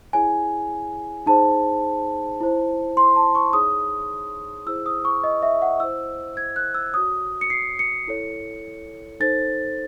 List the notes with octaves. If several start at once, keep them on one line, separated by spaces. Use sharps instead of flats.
E4 G#4 C#5 G#5
D#4 G#4 C5 A5
E4 C5
C6
A5
C#6
D#4 G#4 C#5 D#6
E4 G#4 C5 E6
D#6
C#6
D#5
E5
F#5
E4 C5 E6
G#6
F#6
E6
F#4 C#5 D#6
C#7
C7
C#7
E4 A4 C#5
D#4 A4 C5 A6